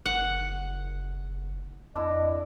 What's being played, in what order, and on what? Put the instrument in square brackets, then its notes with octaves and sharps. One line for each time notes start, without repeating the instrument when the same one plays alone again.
[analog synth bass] F#1 [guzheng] F#5
[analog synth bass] F2 [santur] D4 E4 [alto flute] D#5